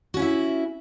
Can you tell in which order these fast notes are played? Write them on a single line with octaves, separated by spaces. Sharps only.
F#4 C#4 E4 E5